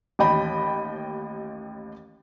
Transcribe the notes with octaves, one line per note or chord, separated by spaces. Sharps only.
A1 D#2 D#5 G5 B5